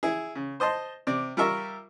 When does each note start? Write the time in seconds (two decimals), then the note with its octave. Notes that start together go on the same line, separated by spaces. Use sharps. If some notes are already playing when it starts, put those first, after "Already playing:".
0.03 E4 G#4
0.35 C#3
0.60 C5 D#5 A5 C6
1.07 C3 D5
1.37 G3 F4 A#4 E5 C#6